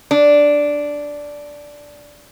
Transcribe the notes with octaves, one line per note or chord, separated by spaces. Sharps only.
D4